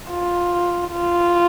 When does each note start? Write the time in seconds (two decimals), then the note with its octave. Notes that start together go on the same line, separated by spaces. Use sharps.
0.10 F4
0.92 F4